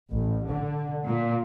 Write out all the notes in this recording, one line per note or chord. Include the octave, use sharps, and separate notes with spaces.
A1
D3
A#2